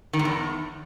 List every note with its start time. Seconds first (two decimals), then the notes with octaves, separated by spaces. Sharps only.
0.13 D#3
0.19 G#2
0.25 E2